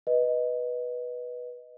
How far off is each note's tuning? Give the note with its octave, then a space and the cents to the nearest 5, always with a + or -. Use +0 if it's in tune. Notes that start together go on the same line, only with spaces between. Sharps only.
B4 -10 D#5 +0